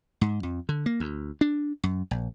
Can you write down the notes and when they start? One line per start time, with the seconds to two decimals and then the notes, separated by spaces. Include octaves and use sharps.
0.21 G#2
0.43 F2
0.69 D3
0.86 A#3
1.00 D2
1.41 D4
1.83 F#2
2.11 A#1